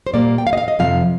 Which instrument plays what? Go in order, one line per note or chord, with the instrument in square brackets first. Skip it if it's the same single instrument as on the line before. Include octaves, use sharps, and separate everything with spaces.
[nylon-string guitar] C5
A#2 G3 A#3 D5
G5
F5
D#5
F5
D#5
F2 C3 F3 F5